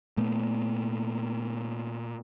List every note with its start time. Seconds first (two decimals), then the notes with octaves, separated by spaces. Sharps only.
0.17 A#2 A3 B3